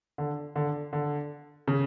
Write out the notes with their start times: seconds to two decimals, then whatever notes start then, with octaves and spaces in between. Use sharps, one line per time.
0.18 D3
0.56 D3
0.93 D3
1.68 C#3